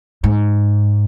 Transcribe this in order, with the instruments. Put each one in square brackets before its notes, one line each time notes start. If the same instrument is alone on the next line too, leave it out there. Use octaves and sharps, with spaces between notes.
[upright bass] G#2